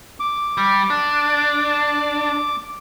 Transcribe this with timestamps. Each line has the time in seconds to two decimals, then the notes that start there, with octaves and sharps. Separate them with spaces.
0.20 D6
0.57 G3
0.90 D4